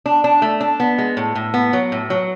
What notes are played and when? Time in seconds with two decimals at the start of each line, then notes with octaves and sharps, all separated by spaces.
0.06 D4
0.24 D4
0.42 A3
0.61 D4
0.80 B3
0.98 G#3
1.17 A2
1.35 A2
1.54 B3
1.73 F#3
1.92 A2
2.10 F#3